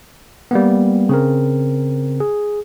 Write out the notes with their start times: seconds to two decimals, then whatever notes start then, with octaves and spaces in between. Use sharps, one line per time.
0.51 G3 A#3 B3
1.09 C#3 C4 A#4
2.20 G#4